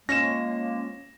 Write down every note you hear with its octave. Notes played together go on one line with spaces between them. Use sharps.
F3 G#3 A#3 C#4 A#6 E7